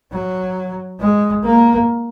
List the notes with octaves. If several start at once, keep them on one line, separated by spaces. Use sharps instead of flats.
F#3
G#3
A#3